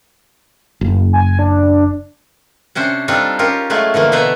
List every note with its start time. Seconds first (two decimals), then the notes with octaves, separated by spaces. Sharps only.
0.81 F#1
1.13 G#5
1.39 D4
2.75 C3 C#4 D4 C5
3.08 G3 C4 D4 D#4 F4 A4
3.39 C#4 F4 G4 A#4
3.70 F#3 G#3 A3 E4 F4
3.94 D3 E3 F3 A#3
4.12 B2 A3 B4 C5 E5 A#5